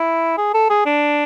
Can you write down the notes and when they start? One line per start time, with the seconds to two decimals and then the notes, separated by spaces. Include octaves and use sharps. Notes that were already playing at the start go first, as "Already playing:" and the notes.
Already playing: E4
0.37 G#4
0.54 A4
0.70 G#4
0.86 D4